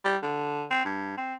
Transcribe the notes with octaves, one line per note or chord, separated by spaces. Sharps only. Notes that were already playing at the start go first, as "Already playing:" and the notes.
G3
D3
C4
G2
C4